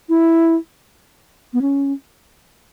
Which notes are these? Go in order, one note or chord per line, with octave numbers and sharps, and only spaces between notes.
E4
B3
C#4